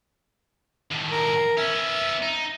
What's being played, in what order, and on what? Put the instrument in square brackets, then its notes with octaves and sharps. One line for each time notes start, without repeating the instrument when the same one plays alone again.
[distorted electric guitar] D#2 A2
[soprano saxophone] A#4
[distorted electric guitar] B3 C#4 [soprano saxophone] E5
[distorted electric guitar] D#4